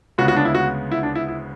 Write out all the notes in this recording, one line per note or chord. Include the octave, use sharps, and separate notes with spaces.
D2 C#3 G#3 B3 F#4
F#4
D4
E4
F#4
E4
D4
E4
E4